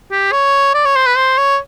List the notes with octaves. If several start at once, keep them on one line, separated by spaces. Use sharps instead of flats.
G4
C#5
D5
C#5
C5
B4
C5
C#5